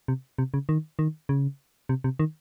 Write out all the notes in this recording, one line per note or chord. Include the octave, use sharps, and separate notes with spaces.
C3
C3
C#3
D#3
D#3
C#3
C3
C3
D#3